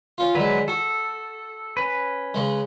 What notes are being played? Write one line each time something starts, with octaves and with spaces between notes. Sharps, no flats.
C#4 F4
D3 F#3 G#3 B4
F#4 A4
C#4 B4
C#3 G#3